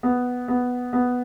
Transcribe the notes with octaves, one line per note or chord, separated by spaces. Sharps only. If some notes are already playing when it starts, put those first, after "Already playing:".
B3
B3
B3